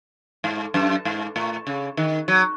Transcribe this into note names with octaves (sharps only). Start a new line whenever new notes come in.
G#2
F#2
G#2
A2
C#3
D#3
F#3